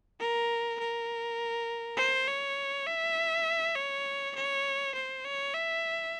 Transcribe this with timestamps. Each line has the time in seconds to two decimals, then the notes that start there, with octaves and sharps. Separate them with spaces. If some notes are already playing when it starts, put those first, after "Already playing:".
0.20 A#4
0.79 A#4
1.97 C5
2.28 C#5
2.87 E5
3.76 C#5
4.35 C#5
4.95 C5
5.24 C#5
5.54 E5